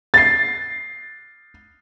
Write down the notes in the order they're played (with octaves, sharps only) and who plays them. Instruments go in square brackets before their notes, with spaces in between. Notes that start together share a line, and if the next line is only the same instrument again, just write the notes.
[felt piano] A6 C7